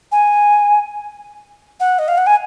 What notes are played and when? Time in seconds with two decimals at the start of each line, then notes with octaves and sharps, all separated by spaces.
0.12 G#5
1.80 F#5
1.99 D#5
2.08 F5
2.18 F#5
2.27 G#5